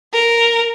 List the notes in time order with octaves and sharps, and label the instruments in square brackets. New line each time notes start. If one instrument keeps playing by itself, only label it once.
[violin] A#4